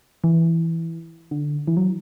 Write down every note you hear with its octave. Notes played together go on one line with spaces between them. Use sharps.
E3
D3
E3
F#3